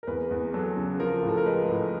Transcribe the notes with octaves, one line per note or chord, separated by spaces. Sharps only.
A#4
E2 B4
E2
F#3 A4
C#3
F3 A#4
A2
A4
A#4
G#3 B4
A2